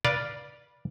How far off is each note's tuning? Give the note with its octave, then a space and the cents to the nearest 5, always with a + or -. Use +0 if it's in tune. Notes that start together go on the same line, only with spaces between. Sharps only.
B4 -20 D5 +0 F5 +0